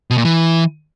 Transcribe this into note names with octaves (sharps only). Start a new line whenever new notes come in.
B2
A#2
E3